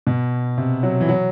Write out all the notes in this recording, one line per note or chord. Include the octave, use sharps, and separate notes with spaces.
B2
C3
F#3
E3
F#3